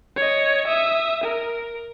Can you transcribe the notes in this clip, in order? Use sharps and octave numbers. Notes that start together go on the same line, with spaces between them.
C#5 D#5
E5 D#6
A#4